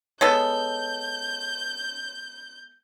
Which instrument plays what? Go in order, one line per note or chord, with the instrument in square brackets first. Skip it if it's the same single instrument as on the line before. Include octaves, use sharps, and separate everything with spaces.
[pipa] G#3 B3 A4 [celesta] C#5 [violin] G6